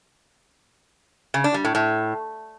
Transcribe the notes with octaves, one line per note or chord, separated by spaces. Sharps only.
C#3
D4
G3
A2
A2